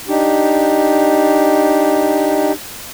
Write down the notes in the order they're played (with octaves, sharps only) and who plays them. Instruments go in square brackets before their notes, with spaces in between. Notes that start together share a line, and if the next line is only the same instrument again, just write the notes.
[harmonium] D4 D#4 G4